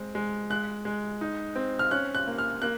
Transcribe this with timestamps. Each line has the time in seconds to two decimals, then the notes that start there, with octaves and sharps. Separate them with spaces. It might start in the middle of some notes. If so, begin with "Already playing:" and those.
Already playing: G#3 C4
0.15 G#3
0.50 G#3 F#6
0.85 G#3
1.21 D#4
1.56 C4
1.79 F6
1.91 C#4 F#6
2.15 F#6
2.27 A#3
2.38 F6
2.62 A#3 F#6